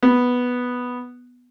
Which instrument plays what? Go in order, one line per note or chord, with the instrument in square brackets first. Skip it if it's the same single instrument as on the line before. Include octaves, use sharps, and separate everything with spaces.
[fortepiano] B3